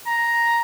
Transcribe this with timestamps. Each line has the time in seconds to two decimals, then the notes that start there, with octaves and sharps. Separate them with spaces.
0.06 A#5